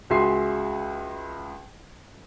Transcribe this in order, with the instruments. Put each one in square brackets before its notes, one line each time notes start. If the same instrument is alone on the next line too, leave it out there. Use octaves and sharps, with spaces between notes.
[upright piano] C#2 F#4 G#4 E5 C6 C7